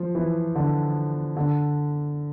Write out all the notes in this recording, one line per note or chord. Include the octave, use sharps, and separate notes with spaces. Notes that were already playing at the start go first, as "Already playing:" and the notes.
Already playing: F3
E3
D3
D3